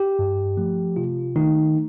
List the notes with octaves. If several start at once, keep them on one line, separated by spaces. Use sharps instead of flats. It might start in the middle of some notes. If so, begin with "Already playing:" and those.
Already playing: G4
G2
F3 A3
C3 F4
D#3 A3 D#4